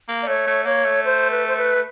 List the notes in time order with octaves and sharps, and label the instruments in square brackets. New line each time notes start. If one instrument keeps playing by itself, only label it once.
[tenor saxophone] A#3
[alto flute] D5
[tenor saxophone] A3 [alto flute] C#5
[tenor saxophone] A3
[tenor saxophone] A#3 [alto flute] C#5
[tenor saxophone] A3
[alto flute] C5
B4
C5
B4
[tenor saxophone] A3